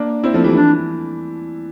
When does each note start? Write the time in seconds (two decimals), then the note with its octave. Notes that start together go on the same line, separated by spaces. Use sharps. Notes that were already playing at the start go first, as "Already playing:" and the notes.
Already playing: A#3 D4
0.24 C4 E4
0.34 F3 A3
0.44 E3 G3
0.54 E3 D4